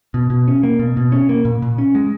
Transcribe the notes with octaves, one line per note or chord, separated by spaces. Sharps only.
B2
B2
C#4
A#3
B2
B2
C#4
A#3
A#2
A#2
C#4
G#3